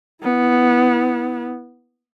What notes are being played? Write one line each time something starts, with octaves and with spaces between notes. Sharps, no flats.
B3 E4